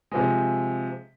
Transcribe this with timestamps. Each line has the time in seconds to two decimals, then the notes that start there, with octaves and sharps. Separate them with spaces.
0.12 C3 F3 G#3